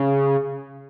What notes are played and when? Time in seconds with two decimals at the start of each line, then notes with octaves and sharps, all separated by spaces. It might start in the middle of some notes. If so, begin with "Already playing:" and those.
Already playing: C#3